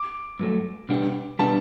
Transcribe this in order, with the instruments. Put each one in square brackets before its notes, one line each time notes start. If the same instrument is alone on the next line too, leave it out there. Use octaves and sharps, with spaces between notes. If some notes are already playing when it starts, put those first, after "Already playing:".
Already playing: [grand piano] D6
[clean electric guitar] G2 F#3 A3
B2 G3 B3 D4 G4
[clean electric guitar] B2 G3 B3 D4 G4 [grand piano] A5